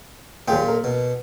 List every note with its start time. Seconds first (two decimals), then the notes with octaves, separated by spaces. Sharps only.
0.48 D#2 A#2 F4 G#4 G5
0.68 A#4
0.84 B2